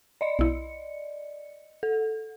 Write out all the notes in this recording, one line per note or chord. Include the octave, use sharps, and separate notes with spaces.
D5 D#5 C#7
B1 E4
A4